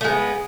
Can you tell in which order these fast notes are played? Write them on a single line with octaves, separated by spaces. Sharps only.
A3 G#3 B3